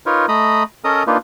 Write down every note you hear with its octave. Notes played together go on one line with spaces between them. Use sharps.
D#4 F4 A#4 B4 C#5
A3 D#5 A#5 B5 D#6
C#4 A4 A#4 D#5 A#5 D#6
A#3 D4 D#4 F4 B4